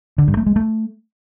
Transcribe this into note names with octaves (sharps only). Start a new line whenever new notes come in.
D3
G2
A3
G#3
A3